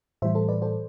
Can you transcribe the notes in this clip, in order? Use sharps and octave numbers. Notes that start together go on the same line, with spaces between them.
A2 E3 G3 C5 E5
A4 C5
B4 D5
A4 C5